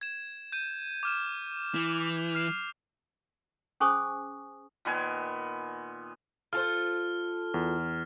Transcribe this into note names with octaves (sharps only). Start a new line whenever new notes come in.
G#6 E7
G6 D#7
D6 F6 E7
E3
F6 C7 F7
C#4 G#4 C5 G#5 C#6 D#6
A#2 D#3 B3 G#5
F4 A4 C5 F6
E2